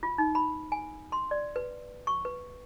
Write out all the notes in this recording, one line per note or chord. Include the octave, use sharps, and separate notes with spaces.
F4
D#4
B5
G#5
C6
D5
B4
C#6
B4